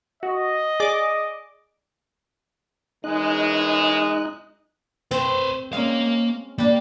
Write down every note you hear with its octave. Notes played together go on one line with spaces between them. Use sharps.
F#4 D#5
G#4 D5 D6
F#2 E3 G#3 D#4 D#5 F#6
C4 B4 C5
G#3 A#3 C#4 F5
G3 A#3 D4